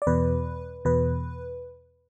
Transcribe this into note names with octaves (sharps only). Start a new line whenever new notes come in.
D5
E2 B2 B4
E2 B2 B4